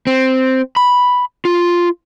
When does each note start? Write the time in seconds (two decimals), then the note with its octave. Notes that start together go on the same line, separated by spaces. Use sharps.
0.07 C4
0.76 B5
1.45 F4